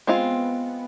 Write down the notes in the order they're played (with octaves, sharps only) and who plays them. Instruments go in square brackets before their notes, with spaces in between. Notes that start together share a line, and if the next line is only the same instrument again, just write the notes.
[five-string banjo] G#3 C4 F4 [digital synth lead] B3